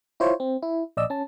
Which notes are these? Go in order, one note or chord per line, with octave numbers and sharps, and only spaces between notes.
E4 F4 C5 C#5
C4
E4
A#1 D5 D#5 E6
C#4 A5